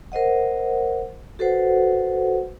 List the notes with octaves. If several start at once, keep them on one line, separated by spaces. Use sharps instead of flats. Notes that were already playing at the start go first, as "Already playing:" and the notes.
A#4 C5 D#5 F#5
F#4 A4 B4 C5 F#5